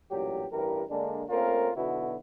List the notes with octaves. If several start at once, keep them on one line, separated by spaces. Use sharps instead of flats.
A1 G2 A#2 F#3 G4
A1 G2 E3 G4 A#4
D3 G#3 A#3 D4
A3 A#3 C4 C#4 F4 A#4
B1 B2 D3 B3 E4 F#4